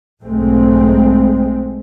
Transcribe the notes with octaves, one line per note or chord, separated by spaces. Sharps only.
B1 G#2 G#3 A3 C4